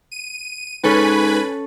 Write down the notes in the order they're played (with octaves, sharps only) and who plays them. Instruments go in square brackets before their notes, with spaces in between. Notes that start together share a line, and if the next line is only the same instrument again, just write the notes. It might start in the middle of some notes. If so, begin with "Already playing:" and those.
[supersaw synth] D#7
[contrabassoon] G#2 [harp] C#4 A4 A5 [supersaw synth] B4 G#5 B5